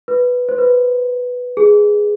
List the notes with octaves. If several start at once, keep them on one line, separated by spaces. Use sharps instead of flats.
B4
C5
B4
G#4